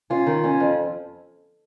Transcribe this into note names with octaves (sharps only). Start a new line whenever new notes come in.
C#4 F4
D#3
C#4
F2